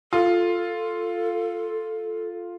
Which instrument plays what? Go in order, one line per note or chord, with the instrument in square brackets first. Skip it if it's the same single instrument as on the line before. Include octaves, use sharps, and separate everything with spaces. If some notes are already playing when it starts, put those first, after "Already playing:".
[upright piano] F4 [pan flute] A4